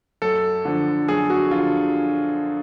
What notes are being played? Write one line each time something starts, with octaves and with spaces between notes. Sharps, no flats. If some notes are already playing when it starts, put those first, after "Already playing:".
F#2 A4
D3 F3
F#2 G#4
F#4
D3 F3 F4